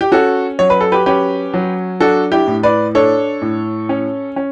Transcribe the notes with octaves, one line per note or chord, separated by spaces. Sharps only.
G4
C#4 F#4 A4
F#3 C#5
B4
A4
G4 B4
C#4 G4 B4
F#3
D4 F#4 A4
E4 G4
A2
B4 D5
D4 A4 C#5
A2
C#4
C#4